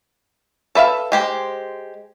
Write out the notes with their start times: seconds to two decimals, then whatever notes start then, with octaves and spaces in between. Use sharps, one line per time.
0.75 A4 B4 E5 F5
1.12 G#3 G4 C5